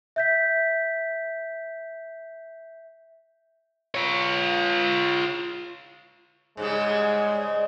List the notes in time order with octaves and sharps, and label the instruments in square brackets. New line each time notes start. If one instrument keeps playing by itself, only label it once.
[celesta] E5 G6 B6
[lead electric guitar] F4 C#5
[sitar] G#2 C#3 G3 [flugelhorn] G#3
[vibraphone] D5 D#5